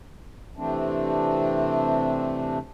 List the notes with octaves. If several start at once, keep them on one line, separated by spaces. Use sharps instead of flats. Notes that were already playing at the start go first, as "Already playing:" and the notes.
C3 E3 A3 C4 D4